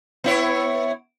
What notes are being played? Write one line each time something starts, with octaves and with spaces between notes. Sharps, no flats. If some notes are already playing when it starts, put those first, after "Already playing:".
B3 E4 C#5